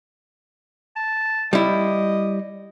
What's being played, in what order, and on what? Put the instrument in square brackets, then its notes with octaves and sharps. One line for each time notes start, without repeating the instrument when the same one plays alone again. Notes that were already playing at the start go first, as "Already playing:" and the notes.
[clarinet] A5
[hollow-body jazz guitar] G3 E4 [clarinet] D#5